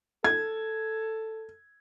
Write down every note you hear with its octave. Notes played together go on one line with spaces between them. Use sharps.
A4 G#6